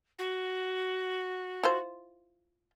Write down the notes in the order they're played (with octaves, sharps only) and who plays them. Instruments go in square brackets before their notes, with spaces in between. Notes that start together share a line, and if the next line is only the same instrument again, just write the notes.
[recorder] F#4
[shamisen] E4 F4 C5